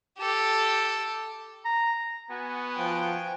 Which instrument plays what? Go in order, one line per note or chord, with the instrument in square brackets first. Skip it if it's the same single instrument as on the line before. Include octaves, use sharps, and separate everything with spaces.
[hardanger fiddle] G4 A4
[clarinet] A#5
[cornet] B3 [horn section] F#4 G#5
[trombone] F3 [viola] G5